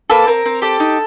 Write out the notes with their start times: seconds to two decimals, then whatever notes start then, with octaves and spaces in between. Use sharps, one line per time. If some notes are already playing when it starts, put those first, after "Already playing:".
0.10 A#3 A4 B4
0.27 C4 A#4
0.46 C4
0.62 G4 A4
0.80 D#4